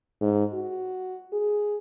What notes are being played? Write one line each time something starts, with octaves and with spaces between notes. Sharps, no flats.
G#2
F#4
G#4